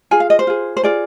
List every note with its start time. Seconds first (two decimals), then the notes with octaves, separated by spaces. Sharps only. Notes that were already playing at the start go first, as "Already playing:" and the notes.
0.11 F4 G#4 G#5
0.20 F5
0.30 D#5
0.39 C5
0.47 F4 G#4
0.77 C5
0.83 F4 G#4 D5